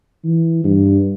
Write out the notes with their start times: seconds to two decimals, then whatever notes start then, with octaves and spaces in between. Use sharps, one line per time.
0.24 E3
0.64 G2